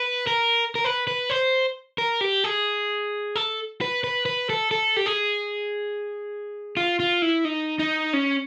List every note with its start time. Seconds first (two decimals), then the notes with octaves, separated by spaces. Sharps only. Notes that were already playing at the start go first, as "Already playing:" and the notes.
Already playing: B4
0.27 A#4
0.75 A#4
0.84 B4
1.07 B4
1.30 C5
1.98 A#4
2.21 G4
2.44 G#4
3.36 A4
3.81 B4
4.04 B4
4.26 B4
4.50 A4
4.71 A4
4.96 G4
5.06 G#4
6.77 F4
7.00 F4
7.22 E4
7.45 D#4
7.79 D#4
8.13 C#4